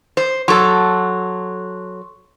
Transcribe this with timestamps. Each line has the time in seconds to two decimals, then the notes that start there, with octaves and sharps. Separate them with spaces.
0.17 C5
0.48 F#3 A4 C6 C#6